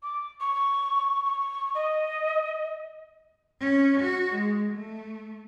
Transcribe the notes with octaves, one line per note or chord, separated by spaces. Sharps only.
D6
C#6
C#6
D#5
C#4
F#4
G#3
A3